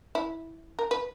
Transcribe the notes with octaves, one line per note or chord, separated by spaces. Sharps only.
E4
A#4
B4